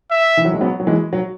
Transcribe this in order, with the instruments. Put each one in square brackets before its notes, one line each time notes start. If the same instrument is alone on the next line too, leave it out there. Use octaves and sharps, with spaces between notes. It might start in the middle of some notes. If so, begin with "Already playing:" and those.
[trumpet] E5
[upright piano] E3
F#3
G#3
F#3 B3
F#3
E3 G#3
F#3